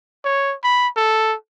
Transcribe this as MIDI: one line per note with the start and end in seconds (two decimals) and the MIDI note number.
0.25 0.55 73
0.63 0.88 83
0.96 1.35 69